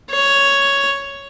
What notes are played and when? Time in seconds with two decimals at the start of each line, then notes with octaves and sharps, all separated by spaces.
0.10 C#5